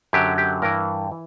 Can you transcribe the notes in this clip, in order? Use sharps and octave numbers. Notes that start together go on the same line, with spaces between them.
F#2 D3 F#3 G4
G4
G2 E3 A#4
E3